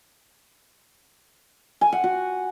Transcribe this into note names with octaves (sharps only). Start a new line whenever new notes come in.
G#5
F#5
F#4